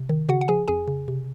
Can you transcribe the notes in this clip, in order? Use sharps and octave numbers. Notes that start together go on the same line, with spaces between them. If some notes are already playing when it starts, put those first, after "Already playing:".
Already playing: C3
D#3
C#3 F#4 F#5
F#5
F3 G#4 G#5
F2 G#4 G#5
C#3
C3